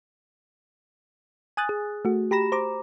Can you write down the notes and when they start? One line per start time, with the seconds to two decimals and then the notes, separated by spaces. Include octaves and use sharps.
1.57 G#5 D#6 F#6 A6
1.69 G#4
2.05 A3 F#4
2.31 G4 A#5 B5 A#6 E7
2.52 C5 A#5 D6